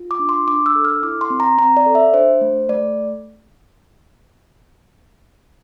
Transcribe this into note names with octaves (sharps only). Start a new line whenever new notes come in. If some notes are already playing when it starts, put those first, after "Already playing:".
Already playing: F4
D6
D4
C6
D4 D6
E6
A4
F6
E4 D6
C6
C4
A#5
C4 A#5
D5
A4
E5
D4 C5
A3
A3 D5